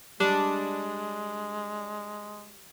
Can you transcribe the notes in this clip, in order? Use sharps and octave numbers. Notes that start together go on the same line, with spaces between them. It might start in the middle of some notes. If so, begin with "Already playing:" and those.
G3 G#3 D4